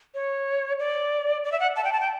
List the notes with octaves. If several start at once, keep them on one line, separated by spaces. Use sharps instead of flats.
C#5
D5
D5
E5
F#5
A5
G5
A5
G5